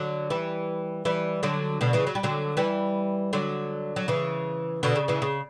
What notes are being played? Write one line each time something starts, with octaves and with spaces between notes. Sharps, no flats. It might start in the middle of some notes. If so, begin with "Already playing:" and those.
Already playing: D3 F#3
E3 G3
E3 G3
D3 F#3
B2 D3
C#3 E3
F#3
G3
D3 F#3
E3 G3
D3 F#3
F#3
C#3 E3
B2 D3
C#3
C#3 E3
C#3